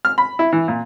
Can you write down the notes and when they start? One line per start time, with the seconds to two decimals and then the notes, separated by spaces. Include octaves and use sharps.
0.05 F6
0.18 B5
0.39 E4
0.53 E3
0.68 A#2